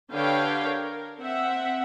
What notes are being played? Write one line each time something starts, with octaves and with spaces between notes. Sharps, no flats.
D3 G4 B4 C#5 F5 G5
A#4
C4 E5 F#5